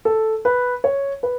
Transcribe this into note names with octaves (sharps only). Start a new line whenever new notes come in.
A4
B4
C#5
B4